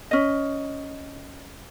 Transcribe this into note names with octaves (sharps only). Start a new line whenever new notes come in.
C#4 D#5